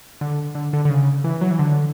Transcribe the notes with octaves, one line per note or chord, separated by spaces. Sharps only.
D3
D3
D3
D3
C#3
E3
F#3
E3
D3